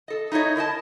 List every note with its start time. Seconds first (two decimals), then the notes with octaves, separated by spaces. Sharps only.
0.08 A4 D#5
0.32 D#4 E4 C5 C#5 D#5
0.56 E4 A#4 D#5 A5